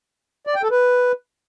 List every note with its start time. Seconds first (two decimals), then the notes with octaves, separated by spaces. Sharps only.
0.47 D5
0.55 G5
0.63 A4
0.71 B4